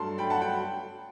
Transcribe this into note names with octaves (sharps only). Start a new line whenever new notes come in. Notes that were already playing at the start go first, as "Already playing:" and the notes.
Already playing: G2 F#3 A3 A5 C6
G2 F#3 A3 G5 B5
F#5 A5
G5 B5